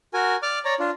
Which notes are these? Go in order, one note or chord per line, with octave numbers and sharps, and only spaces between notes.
F#4 A#4 G#5
D5 D6 F6
C#5 D5 A#5
D4 F4